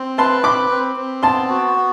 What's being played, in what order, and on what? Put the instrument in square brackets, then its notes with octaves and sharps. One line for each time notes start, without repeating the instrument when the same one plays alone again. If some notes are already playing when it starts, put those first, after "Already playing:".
Already playing: [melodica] C4
[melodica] B4 [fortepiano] A5 C6
[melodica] C4 [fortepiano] B5 D6
[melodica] C4
C4
[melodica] B3 [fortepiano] A5 C6
[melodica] F#4
B3